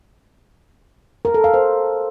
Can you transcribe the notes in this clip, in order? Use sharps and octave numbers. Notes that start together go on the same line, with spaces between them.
A#4
A4
F5
C5